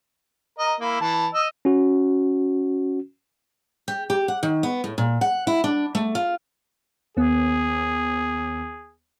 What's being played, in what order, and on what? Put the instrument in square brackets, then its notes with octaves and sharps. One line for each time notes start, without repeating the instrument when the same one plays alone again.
[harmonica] A#4 D#5
A#3 E4
E3 A5
D#5 E6
[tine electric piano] C#4 F#4
[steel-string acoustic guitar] G4
G4
F#5
D#3
B3
A2
A#2
F#5
E4
D4
A3
F4
[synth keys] D#2 B3 [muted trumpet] G#4